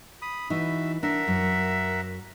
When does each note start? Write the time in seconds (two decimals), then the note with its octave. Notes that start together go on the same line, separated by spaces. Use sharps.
0.22 B5 D#6
0.50 E3 D#4 F#4 E5
1.03 D4 A#4 E5 F#5
1.28 F#2